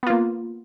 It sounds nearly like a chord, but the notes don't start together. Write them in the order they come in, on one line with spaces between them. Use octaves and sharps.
B3 F4 A#3